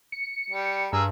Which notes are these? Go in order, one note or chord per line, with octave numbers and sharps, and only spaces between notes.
C#7
G3
G2 G#4 A#4 E6